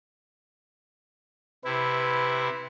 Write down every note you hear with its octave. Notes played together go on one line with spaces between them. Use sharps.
C3 E4 B4